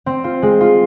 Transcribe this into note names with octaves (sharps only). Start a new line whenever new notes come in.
C4
F4
G#3
F4